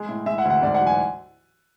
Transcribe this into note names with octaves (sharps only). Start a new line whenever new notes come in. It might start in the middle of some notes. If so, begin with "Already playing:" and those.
Already playing: G#3
A2
G#3 E5
F#5
D2
F#5
G#2 D5
F#5
F#3
G#5